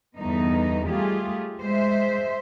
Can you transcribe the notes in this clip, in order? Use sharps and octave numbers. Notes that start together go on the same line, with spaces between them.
E2 G2 D3 B3 D#4
G3 A3 F4 G4 G#4
G#3 C5 E5